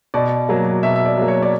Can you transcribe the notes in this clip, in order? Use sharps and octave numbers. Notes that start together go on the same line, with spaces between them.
B2 D5
F#3 A#3
B2 E5
E5
D5
F#3 A#3
C#5
D5